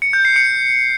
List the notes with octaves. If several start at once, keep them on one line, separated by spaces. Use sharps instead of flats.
C#7
G6
C7
C#7